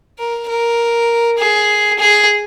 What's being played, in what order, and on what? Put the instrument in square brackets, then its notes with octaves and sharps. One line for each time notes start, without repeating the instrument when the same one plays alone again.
[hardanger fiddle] A#4
A#4
G#4
G#4